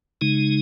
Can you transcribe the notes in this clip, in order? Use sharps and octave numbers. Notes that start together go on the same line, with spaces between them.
C#3 G#3 D#4